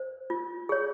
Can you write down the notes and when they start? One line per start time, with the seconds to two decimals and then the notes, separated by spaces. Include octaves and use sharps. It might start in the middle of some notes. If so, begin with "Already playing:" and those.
Already playing: C5
0.30 F4
0.69 G#4 C#5